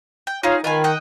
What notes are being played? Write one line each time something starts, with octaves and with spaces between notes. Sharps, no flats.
G5
D#4 F4 G#4 C#5 F5
D#3 F4 B4 G#5
D#5 F#5 G5